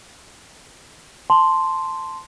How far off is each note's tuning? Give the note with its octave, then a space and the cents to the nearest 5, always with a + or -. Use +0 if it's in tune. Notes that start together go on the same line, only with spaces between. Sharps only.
A5 +0 C6 +0